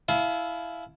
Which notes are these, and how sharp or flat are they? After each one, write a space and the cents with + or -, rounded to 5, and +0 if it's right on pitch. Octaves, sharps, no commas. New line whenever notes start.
E4 +0 F5 +0 A5 -40